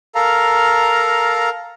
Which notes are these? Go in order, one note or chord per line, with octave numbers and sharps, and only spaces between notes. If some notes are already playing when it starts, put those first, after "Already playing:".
A4 A#4 F5 A#5